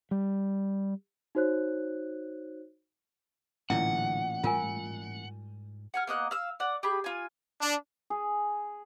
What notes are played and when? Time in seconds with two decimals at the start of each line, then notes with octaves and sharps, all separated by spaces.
0.11 G3
1.35 D#4 F#4 C5 C#5 F#6
3.70 A1 A#2 D3 F#3 C#4 E4 F#5
4.44 G#2 G3 F4 A#4 G#5
5.94 F#5 G#5 F6
6.07 A#3 B3 D#5 F#6
6.31 F5 E6
6.60 D5 F#5
6.83 G4 G#4 B5
7.04 F4 G#5
7.60 D4
8.10 G#4